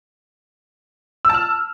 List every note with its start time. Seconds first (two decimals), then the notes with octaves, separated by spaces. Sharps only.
1.25 E6
1.30 A5
1.34 F6